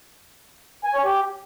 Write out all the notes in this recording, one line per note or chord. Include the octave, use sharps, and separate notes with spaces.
G#5
C#5
G4